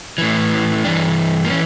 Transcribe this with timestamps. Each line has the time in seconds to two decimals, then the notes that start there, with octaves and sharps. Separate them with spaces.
0.18 A2 E3
0.84 G2 E3 D4
1.45 A#3
1.50 E3 C#4